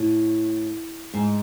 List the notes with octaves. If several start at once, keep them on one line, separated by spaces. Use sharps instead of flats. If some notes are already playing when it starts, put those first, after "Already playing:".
Already playing: A2
G#2